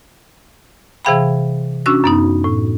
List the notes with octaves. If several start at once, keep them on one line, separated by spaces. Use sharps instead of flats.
C3 E3 G#4 F5 G5 B5
C#4 D4 F#4 C#6 E6
F#2 B3 D#4
A2